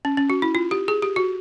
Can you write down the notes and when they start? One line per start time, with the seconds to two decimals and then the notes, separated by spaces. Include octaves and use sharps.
0.05 C#4
0.17 C#4
0.30 F#4
0.42 E4
0.55 F4
0.71 G4
0.88 G#4
1.02 G4
1.16 F#4